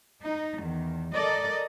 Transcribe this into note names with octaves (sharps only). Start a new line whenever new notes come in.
D#4
E2 D#3
A4 A#4 D5 D#5